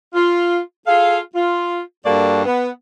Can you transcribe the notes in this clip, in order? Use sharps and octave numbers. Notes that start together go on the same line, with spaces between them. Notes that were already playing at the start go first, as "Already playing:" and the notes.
F4
F4 G#4 A4 F5
F4
G2 G3 A#3 F#4 A4 D5
B3